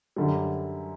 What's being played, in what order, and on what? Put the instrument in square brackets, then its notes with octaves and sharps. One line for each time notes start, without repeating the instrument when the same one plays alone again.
[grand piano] F#2 D3 G3